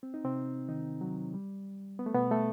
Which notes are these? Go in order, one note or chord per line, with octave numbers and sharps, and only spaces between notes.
C4
D#4
C3 C4
D#3 D#4
F#3
G3
B3
A3
B2 B3
A3 A4